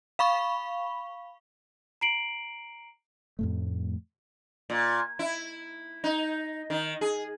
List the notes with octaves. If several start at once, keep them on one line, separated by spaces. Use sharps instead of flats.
F5 B5 C#6
A#5 C7 D7 F#7
F2 A2 A3
A#2
E4
D#4
D#3
G#4